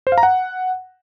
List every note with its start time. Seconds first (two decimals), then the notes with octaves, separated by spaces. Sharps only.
0.07 C5
0.12 F5
0.18 A#5
0.23 F#5